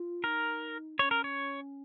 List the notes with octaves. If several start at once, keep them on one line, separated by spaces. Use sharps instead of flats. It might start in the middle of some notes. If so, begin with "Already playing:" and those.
Already playing: F4
D#4 A#4
C#4 C#5
A#4
C#5